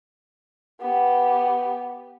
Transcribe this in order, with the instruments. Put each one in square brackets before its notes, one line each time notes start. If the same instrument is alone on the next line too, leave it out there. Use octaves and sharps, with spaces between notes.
[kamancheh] B3 G4